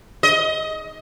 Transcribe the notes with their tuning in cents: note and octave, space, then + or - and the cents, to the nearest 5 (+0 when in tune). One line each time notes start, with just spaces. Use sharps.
D#5 +15